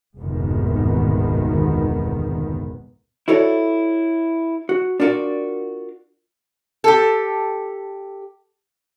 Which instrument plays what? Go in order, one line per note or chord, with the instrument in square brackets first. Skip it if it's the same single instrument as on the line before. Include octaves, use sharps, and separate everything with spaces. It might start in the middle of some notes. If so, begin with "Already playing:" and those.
[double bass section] F1 D2 G#2 B2 D#3 B3
[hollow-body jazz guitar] E4 F#4 A4 C#5 D5
F#4
D4 F4 F#4 A#4 D5
[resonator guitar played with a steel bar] G4 A4